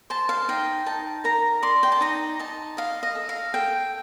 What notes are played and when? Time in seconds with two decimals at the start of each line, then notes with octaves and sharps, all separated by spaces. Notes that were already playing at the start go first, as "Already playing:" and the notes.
0.10 C5 A5
0.29 F5
0.48 D#4 G5
0.86 D#4 A5
1.24 A#4 A#5
1.63 D5 C6
1.83 G5
1.92 A5
2.01 D#4 A#5
2.39 D#4 A5
2.77 D#5 F5
3.03 D#5
3.15 A4
3.29 F5
3.54 A4 G5